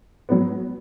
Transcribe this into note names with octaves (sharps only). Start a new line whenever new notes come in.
F#3 B3